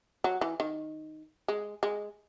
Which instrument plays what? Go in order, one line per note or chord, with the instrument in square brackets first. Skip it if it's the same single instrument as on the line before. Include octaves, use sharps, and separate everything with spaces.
[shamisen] F#3
E3
D#3
G#3
G#3